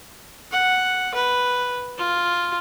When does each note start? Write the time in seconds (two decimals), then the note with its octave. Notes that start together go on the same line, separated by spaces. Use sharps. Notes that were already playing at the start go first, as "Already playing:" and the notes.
0.52 F#5
1.14 B4
1.98 F4